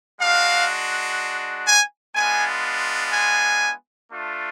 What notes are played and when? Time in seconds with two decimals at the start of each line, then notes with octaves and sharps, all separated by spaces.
0.20 G#3 D4 F#4 F5
1.67 G#5
2.15 G#3 B3 D4 F4 G#5
3.13 G#5
4.11 A3 D4 F4